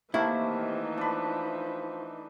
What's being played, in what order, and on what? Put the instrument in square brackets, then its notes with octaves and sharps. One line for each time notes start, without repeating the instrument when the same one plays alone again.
[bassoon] C3 [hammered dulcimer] D#3 A3 A#3 [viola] E3 D#4 [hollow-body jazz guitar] E4
[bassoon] F3 [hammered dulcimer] D4 B4